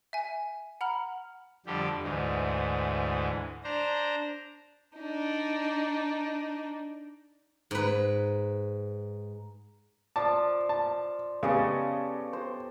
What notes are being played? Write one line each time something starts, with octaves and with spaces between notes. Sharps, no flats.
E5 G#5
F#5 A#5 B5 F6
F2 D3 G3 G4
D2 G#2 E3
D4 C5 A#5
D4 D#4
G#2 B4
F3 D5 A5 D6
A5
C#3 B3 C#4 G4 A4 D#5 A5
C5